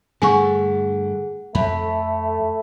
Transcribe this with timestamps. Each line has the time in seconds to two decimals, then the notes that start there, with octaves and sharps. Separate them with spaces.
0.22 G2 D3 A3 G#4 F#5 G#5 C#6
1.55 F2 A3 B5